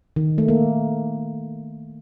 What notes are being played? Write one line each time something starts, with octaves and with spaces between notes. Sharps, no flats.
D#3
A3
A#3